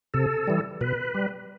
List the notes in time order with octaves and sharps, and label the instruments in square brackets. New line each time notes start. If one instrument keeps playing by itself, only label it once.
[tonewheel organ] C3 A4
E3 G3
B2 B4
G3